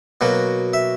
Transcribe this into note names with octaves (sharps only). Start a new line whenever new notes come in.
B2 F#3 A#3
E5